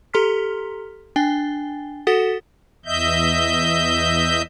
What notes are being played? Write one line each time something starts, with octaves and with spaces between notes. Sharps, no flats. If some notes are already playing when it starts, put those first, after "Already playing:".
G4 A4 A#5 C6 F6 B6
D4 G5 G#5 A6 G7
F#4 A4 F#5 D#6 A6 B6
E2 D#5 E5 G6